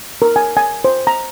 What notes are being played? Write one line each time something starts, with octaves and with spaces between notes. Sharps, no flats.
A#4
G#5
G#5
C5
A#5